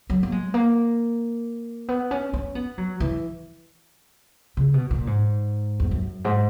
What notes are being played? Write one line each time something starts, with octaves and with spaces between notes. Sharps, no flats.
F#3
A#3
G#3
A#3
B3
C#4
C#4
B3
F#3
E3
C#3
B2
A#2
G#2
E2
F#2
G#2